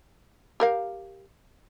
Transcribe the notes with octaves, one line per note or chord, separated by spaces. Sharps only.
G4 A#4 F5